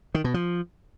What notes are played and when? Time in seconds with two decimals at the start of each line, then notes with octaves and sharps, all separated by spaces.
0.15 D#3
0.24 B2
0.34 F3